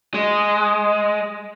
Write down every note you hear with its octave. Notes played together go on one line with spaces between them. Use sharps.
G#3